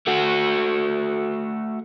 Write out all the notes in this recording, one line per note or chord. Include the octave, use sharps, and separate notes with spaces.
A3 F#4